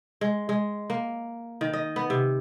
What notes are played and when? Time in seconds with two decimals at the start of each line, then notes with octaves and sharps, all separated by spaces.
0.21 G#3
0.49 G#3
0.90 A#3
1.61 D#3
1.73 D#5
1.96 B3
2.10 C3